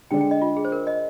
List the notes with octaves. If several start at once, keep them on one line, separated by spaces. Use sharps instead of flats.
D3 G#3 D4 G5
G5
D#5
F4
G#4
C5
A#4
D#5